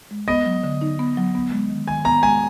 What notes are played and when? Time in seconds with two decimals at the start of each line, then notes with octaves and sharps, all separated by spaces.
0.11 G#3
0.28 B3 D#5
0.46 F#3
0.64 D3
0.81 D#4
0.99 B3
1.17 F#3
1.35 B3
1.52 G#3
1.70 D#3
1.87 D#3 G#5
2.05 B3 A#5
2.23 G#3 G#5